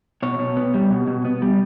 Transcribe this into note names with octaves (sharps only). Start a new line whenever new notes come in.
B2 C#5
B2
B3
G3
B2
B2
B3
G3